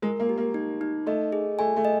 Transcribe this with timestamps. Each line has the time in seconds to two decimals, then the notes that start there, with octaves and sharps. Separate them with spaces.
0.02 G#3 A#4
0.20 A#3
0.29 G4
0.37 A#3
0.54 D#4
0.81 D#4
1.07 A3 D#5
1.32 G#4
1.59 A3 G#5
1.76 A3
1.85 D#5